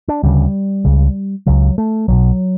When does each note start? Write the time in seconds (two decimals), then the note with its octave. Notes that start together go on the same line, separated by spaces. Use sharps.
0.08 D4
0.23 D2 C#3 G3
0.85 C#2 C#3
1.46 C#2 C#3 F#3
1.78 A3
2.08 B1 B2 F#3